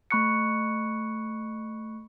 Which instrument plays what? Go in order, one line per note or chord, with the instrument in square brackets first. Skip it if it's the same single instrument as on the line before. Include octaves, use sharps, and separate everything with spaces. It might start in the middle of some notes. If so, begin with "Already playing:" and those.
[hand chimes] A3 B5 C#6 F#6 C#7